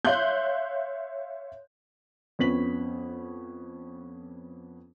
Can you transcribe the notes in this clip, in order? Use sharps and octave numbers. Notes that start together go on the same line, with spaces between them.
C#5 E5 F5 C6 F#6 G6
F2 B3 C#4 B6 F#7